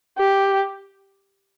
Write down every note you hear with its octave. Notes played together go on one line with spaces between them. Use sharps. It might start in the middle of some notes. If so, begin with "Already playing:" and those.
G4